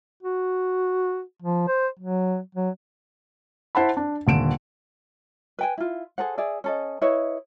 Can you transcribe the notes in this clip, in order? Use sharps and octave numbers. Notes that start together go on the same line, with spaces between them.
F#4
F3
C5
F#3
F#3
E4 C5 F#5 A5 B5
D4
D#1 D3 D7 E7
B4 G5 G#5
E4 F4
G#4 A4 C5 F#5
G#4 D5 E5
C#4 A4 D#5
E4 B4 C#5 D#5